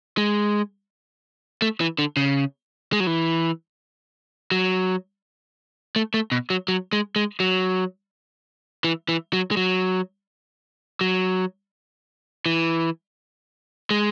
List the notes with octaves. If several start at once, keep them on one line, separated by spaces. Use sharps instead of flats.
G#3
A3
E3
D3
C#3
G#3
F#3
E3
F#3
A3
A3
B2
F#3
F#3
G#3
G#3
F#3
E3
E3
F#3
G#3
F#3
F#3
E3
G#3